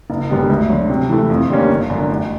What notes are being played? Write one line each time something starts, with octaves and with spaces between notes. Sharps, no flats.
F#1
F#2 D3 G3 B3
D2
D3 F#3
C3
E3 A3
F2
D3 G3 A#3 C#4
G1
F#2 D3
A1